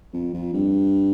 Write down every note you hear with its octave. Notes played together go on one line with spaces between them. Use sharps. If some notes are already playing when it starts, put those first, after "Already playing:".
F2
F2
G2